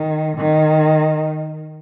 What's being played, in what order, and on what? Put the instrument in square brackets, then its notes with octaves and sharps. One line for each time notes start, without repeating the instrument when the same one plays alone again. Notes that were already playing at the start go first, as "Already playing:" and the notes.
Already playing: [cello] D#3
D#3